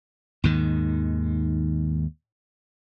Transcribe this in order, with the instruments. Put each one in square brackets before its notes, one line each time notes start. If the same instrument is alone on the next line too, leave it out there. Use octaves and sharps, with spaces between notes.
[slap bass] D#2 G#2 D#3